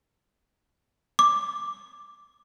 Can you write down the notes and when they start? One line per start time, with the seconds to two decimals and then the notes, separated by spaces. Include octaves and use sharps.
1.19 D6